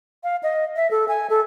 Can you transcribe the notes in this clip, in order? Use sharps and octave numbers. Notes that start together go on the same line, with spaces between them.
F5
D#5
E5
A4
G#5
A4